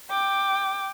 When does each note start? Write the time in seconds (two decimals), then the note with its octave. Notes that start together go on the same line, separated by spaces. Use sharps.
0.10 G5 D6